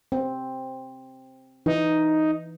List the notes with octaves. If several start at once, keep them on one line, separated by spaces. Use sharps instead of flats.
C4
E3 D#4